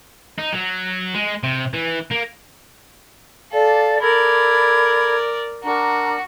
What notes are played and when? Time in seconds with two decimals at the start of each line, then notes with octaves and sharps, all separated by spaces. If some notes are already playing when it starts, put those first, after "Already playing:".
0.39 D#4
0.53 F#3
1.15 G#3
1.43 C3
1.74 E3
2.11 A#3
3.52 A4 D5 F5
4.00 A4 A#4 D5 B5 G#6
5.63 D4 F#4 A#4 A#5